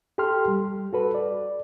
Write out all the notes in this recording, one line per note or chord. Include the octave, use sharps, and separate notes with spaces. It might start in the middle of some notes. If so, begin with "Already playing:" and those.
G4 A4 G5 C6 F6
G3
F#4 A4 B4
D5